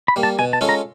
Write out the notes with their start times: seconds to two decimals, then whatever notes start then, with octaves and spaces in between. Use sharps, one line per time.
0.08 B5
0.16 G3 A#3
0.23 A5
0.39 B2 G#5
0.53 A5
0.61 G#3 C#4 F4 A4
0.69 A#5